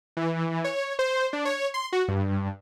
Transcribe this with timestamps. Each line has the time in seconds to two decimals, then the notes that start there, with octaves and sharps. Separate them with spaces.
0.17 E3
0.64 C#5
0.99 C5
1.33 D4
1.45 C#5
1.74 C6
1.92 F#4
2.08 G2